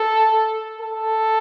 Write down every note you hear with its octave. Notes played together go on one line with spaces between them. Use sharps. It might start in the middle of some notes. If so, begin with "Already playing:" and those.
Already playing: A4
A4